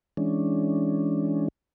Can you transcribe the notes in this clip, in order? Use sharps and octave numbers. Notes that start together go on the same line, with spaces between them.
E3 G#3 C#4 D4